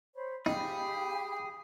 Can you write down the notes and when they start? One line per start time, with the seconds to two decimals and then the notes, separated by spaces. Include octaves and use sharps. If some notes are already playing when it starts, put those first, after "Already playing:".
0.15 C5 C#5 B5
0.46 D#4 G4 G#4 F5 G5 B5